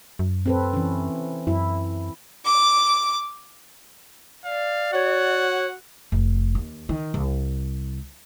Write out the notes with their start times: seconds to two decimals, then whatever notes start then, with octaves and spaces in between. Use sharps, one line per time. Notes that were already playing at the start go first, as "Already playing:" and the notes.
0.19 F#2
0.46 C4 A4 B4
0.74 E3 C#4
1.47 F#2 E4
2.44 D6
4.45 D5 F5
4.93 F#4 C#5 F#5
6.12 F1
6.55 D#2
6.89 D#3
7.14 C2